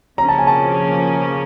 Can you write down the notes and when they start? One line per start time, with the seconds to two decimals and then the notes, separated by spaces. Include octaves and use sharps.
0.18 C#3 F3 A#3 C#4 A#5
0.29 A5
0.38 G#5
0.47 A5